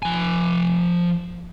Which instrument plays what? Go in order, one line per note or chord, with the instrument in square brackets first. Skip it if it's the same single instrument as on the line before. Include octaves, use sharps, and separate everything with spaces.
[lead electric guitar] F3 G#5